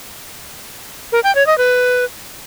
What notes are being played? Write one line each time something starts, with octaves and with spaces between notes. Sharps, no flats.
A#4
G5
C#5
D#5
B4